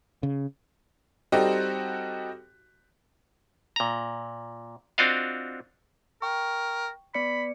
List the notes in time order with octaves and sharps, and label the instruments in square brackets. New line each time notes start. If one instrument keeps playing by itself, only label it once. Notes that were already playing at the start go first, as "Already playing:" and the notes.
[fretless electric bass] C#3
[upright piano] G3 C4 D#4 F#4 G4 A4
[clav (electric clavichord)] A#2 A#5
C4 D4 F4 F#4 D#5 F5
[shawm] A#4 [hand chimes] G5 C#6
[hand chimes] B3 D5 C#7 [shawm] B5